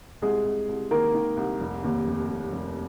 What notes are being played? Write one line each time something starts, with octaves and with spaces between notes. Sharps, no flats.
C2 G#3 G#4
C2
C2
D#3 A#3 A#4
D#3
C2
F1
D#2
F1
F1
F1